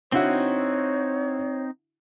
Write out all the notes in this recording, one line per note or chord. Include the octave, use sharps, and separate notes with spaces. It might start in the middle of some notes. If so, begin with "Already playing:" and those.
D3 C4 D#4 E4 F#4 C#5